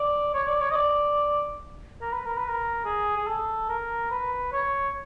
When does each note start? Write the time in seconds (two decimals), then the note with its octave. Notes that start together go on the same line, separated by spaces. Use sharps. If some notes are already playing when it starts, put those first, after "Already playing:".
Already playing: D5
0.34 C#5
0.47 D5
0.61 C#5
0.71 D#5
0.75 D5
2.01 A#4
2.13 B4
2.25 A#4
2.38 B4
2.49 A#4
2.85 G#4
3.16 G#4
3.27 A4
3.69 A#4
4.11 B4
4.52 C#5